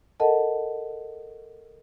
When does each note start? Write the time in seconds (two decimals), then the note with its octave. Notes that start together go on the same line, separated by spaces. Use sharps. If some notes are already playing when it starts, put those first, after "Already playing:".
0.20 A4 A#4 D#5 F#5 A5